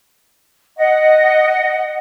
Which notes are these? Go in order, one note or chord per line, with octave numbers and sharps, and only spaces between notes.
D#5 F#5